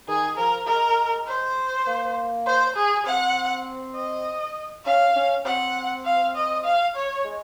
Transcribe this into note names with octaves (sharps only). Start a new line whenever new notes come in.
D#3 G#4
F3 A#4
G#3 A#4
C5
A#3
C5
G#4
C4 F#5
D#5
C#4 F5
C#4
C4 F#5
F5
D#5
F5
C#5
G#3